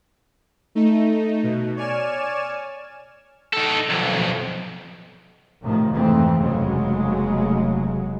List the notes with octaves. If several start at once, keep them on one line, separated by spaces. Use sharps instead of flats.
A3 D#4
B2
C#5 D5 G#5 F6 E7
D#4 A4
B1 F2
A2 C3 D#3 F3
F2 G#2 E3 A3 C4
F1 D#2 C#3 F#3 G#3